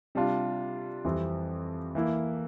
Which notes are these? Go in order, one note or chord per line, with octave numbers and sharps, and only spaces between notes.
C3 G3 D4 F4
F2 E3 G3 C4
E3 A#3 E4